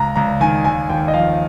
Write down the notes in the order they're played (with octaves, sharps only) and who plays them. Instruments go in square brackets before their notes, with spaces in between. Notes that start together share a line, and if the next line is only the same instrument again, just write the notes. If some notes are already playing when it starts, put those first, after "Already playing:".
Already playing: [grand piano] C#2 A#5
C#2 A#5
D#3 G#5
D#2 G#5
D#2 G5
D#5
F3 F5